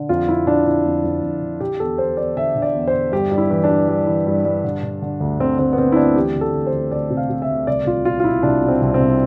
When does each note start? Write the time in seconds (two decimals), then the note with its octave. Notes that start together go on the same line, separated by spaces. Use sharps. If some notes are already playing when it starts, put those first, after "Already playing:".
Already playing: D3
0.09 F2 F4
0.28 F2 E4
0.47 D3 D4
0.66 D3 E4
0.85 F2
1.04 F2
1.23 F2
1.42 D3
1.60 D3 G4
1.80 E2 A4
1.98 E2 C5
2.17 E2 D5
2.36 D3 E5
2.56 D3
2.62 D5
2.75 E2
2.88 C5
2.94 D3
3.12 G2 G4
3.31 G2
3.38 E4
3.50 E3
3.64 D4
3.69 G2
3.88 G2
4.07 E3
4.27 G2
4.45 G2
4.64 D3
4.83 D3
5.02 D3
5.20 D2
5.40 D3 C4
5.59 D2 C4
5.73 B3
5.78 D3 C4
5.92 E4
5.96 D2 D4
6.16 E3 G4
6.35 D2
6.41 A4
6.54 D2
6.67 C5
6.73 D2
6.91 D2 D5
7.10 C3
7.17 F5
7.30 C3
7.42 E5
7.48 D2
7.67 C2 D5
7.86 C2 F4
8.05 B2 F4
8.20 F4
8.24 B2 E4
8.43 C2 D4
8.62 B2
8.68 C4
8.82 C2
8.94 C4
9.00 C2